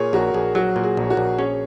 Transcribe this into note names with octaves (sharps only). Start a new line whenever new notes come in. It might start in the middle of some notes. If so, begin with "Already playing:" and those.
Already playing: A#2 G#4 A#4 C#5
A#1 F#4 A#4
A#1 G#4
F#3 F#4
A#2
G#4
A#1 C#5
F#4 A#4
A#1
C#4 G#4 C#5